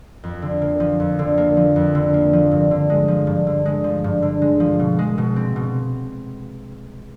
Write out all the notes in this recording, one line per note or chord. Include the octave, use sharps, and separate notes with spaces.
F2
D3
A#3
F3
F2
D3
A#3
F3
F2
D3
A#3
F3
G2
D3
G#3
F3
G2
D3
G#3
F3
G2
D3
G#3
F3
B2
G#3
B2
C4
B2